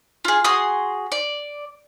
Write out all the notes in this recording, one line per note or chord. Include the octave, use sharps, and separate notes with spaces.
F4 G#4
F#4 G#4 C6 D#6
D5